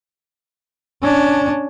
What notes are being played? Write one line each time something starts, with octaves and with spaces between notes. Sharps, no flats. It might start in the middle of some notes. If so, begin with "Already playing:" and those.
C#4 D4